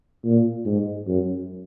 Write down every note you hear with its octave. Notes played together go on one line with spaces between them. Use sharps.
A#2
G#2
F#2